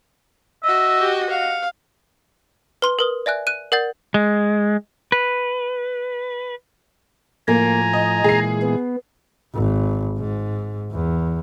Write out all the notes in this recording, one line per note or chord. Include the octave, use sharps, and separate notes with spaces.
F#4 D#5 E5
G4
F5 F#5
B4 C6 G7
A#4 B4 D#6
D5 E5 G#5 F#6
F#6 D#7
A#4 D5 F#5 G6 A6
G#3
B4
A2 F3 A#3 G#5 A#5
D#5
A#2 E3 G#3 G#4 C7
B3
G#1
G#2
E2